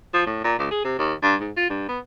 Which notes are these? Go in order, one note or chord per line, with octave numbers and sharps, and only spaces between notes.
F3
A2
A#2
C#2
G#4
C3
D#2
G2
G#2
F4
G2
B3